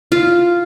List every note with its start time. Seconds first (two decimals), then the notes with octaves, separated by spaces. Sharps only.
0.12 F4